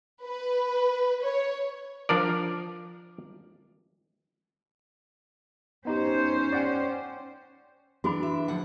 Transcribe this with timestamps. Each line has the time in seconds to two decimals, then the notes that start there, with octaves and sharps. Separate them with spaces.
0.24 B4
1.23 C#5
2.09 F3 D4 A#4 D5
5.85 B3 C#4 D#4 G4 C5
6.52 D5 F#5 G5
8.04 E3 D4 F#4 G#4 B5
8.23 E5
8.48 D2 F3 F#5